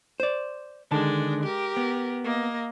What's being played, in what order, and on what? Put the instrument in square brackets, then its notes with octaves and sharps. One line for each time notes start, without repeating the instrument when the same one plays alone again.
[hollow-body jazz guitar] C5 D5
[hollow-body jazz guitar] D3 D#3 A5 [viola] G#3 D4
[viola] G4 A#4
[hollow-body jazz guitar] B3
[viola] A#3 D#5